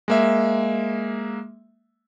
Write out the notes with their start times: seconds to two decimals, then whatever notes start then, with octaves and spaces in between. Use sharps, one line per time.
0.08 G#3 A#3 E5